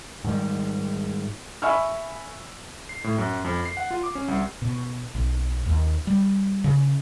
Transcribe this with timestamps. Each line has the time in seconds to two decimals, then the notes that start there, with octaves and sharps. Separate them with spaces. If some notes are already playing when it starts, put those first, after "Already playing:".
0.24 G#2 D#3 G3
1.62 E5 G#5 B5 C#6 E6 F6
2.89 C7
3.04 A2
3.18 F#2
3.45 F2
3.65 C7
3.77 F#5
3.91 F4
4.03 D6
4.15 C#4
4.28 C2
4.62 B2
5.15 B1
5.66 D#2
6.07 G3
6.64 C#3